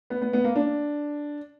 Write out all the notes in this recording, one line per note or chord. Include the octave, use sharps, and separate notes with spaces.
B3
B3
B3
A#3
D4